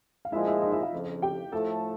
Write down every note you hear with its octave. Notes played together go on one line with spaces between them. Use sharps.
F5
A#2 F3 G#3 E4 E5
E4 E5
D#4 D#5
E4 E5
F4 F5
F2 C#3 F3
G4 G5
A2 F3 A3 A4 A5